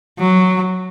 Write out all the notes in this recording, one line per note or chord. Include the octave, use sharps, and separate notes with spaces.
F#3